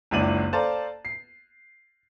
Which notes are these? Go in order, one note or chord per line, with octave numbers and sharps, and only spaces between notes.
F#1 C#2 D4 E4 D#7 F#7
A4 C5 D5 F5 A5 A#5
C7